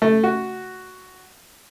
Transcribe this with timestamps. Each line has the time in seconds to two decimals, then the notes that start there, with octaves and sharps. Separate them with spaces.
0.02 A3
0.24 F#4